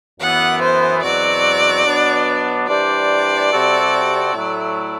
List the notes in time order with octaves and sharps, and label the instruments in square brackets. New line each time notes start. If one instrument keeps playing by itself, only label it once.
[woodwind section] F#2 E3 B3 [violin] F#5
[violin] C5
[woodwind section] E2 B2 F#3 C4 F#4 [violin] D5
[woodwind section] B2 F#3 B3 D4
[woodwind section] E3 G3 D4 G4 C5 [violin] D5
[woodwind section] C3 G3 C4 F#4 A4
A2 F#3 A3 E4